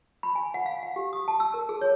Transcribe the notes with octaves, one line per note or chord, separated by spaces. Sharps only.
B5
G#5
F#5
F5
F#5
G4
D#6
A5
E6
A#4
G#4
C#5